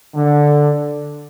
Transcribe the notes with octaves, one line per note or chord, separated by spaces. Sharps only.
D3